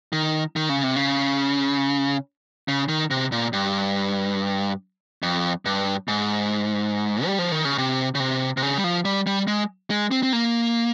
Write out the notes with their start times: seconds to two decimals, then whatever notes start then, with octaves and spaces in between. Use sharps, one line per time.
0.13 D#3
0.56 D#3
0.69 C#3
0.83 C3
0.96 C#3
2.68 C#3
2.89 D#3
3.11 C3
3.32 A#2
3.53 G2
5.23 F2
5.65 G2
6.08 G#2
7.26 G3
7.39 F3
7.52 D#3
7.65 C#3
7.78 C3
8.15 C#3
8.20 C3
8.57 C3
8.62 C#3
8.78 G3
8.84 F3
9.05 G3
9.27 G3
9.48 G#3
9.90 G#3
10.11 C4
10.23 C4
10.33 A#3